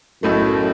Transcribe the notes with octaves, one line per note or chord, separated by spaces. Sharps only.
B1 F#2 A2 A3